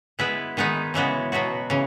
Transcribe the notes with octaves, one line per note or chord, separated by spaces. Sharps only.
G#3 B3 E4 B4
D#3 G#3 B3 D#4
C#3 E3 G#3 B3 F#4
B2 F#3 B3 F#4
C#3 E3